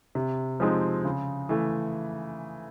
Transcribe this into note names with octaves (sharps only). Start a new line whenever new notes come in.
C3
F3 G#3 C4 D#4
C#3
E3 A3